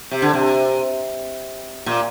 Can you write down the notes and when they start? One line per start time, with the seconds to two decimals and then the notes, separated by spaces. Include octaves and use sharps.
0.11 C3
0.22 D3
0.33 C3
1.86 A#2